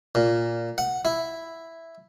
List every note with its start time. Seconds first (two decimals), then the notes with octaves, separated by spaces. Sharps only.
0.15 A#2
0.78 F#5
1.05 E4